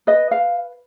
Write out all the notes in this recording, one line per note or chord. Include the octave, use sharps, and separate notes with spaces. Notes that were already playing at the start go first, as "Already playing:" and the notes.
B4 D#5
F5